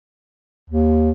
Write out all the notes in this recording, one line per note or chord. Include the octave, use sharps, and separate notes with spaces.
D#2